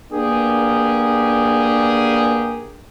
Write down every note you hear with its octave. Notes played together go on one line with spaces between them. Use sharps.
A#3 B3 D4 G4 G#4